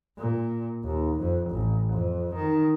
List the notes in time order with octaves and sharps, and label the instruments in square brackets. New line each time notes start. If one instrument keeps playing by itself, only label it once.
[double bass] A#2
D#2
F2
A1
F2
D#3